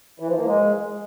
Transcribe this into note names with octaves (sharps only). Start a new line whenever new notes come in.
E3
F3
A#3
G#3